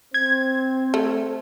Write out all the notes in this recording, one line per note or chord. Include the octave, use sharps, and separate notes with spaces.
C4 C5 G#6
A3